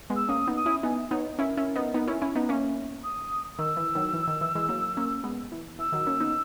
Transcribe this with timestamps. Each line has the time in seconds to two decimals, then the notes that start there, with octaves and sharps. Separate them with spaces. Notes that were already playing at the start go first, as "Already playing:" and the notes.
0.10 G#3 B3
0.16 E6
0.29 A#3 C#4 D#6
0.47 B3 D#4
0.56 D#6
0.66 C#4 E4
0.83 B3 D#4 G#5
0.97 E5
1.11 B3 D#4 C#5
1.39 C#4 E4 A#4
1.57 C#4 E4
1.76 B3 D#4
1.94 B3 D#4
2.08 C#4 E4
2.22 C#4 E4
2.35 B3 D#4
2.49 A#3 C#4 E5
3.04 D#6
3.59 D#3 E6
3.77 E3
3.95 D#3 F#3
4.14 E3
4.27 D#3
4.41 E3
4.55 E3 G#3
4.69 F#3 A#3
4.97 A#3 C#4
5.24 G#3 B3
5.52 E3
5.79 E3 E6
5.92 D#3 F#3
6.07 A#3 C#4
6.20 B3 D#4